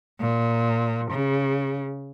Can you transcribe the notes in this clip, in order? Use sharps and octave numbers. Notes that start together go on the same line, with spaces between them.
A#2
C#3